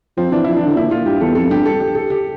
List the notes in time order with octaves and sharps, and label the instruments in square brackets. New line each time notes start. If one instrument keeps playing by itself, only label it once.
[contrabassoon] F3 [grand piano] C4
[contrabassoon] E3 [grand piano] D4
[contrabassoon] F3 [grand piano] E4
[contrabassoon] E3 [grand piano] D4
[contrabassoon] D3
[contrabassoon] A#2 [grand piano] E4
[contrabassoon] A#2 [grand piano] F4
[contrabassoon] G2 [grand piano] G4
[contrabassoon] E2 [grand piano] A4
[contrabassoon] F2 [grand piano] A4
[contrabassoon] G2 [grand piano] G4
[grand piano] A4
G4
A4
G4